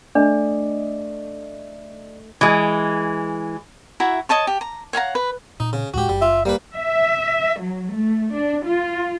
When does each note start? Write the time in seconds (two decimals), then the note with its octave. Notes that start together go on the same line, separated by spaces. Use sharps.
0.15 A3 D4 D5 D#5
2.41 E3 G#3
4.00 E4 F#4 E5 A#5
4.29 C#5 D#5 A5 C#6
4.47 G4
4.61 A#5
4.93 C#5 F5 F#5 A#5
5.15 B4
5.60 A#2 D#4
5.73 C#3
5.94 D1 A2 G#3 F#4 G4
6.09 F#1 G3
6.22 F4 E5
6.45 G3 A#3 B4
6.75 E5
7.61 F#3
7.95 A3
8.35 D4
8.67 F4